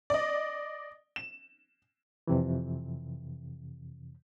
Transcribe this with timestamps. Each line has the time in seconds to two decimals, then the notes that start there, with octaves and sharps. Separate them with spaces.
0.10 D5 D#5
1.16 E7
2.27 F2 C3 E3